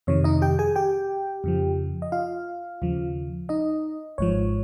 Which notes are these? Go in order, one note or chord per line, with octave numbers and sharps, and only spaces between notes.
F2 C3 D#3 C#5
D#4 D#5
G4 G5
G#4 G#5
G4 G5
F2 C#3 F3
D#5
F4 F5
D#2 C#3 F3
D#4 D#5
G#1 G#2 F3 C#5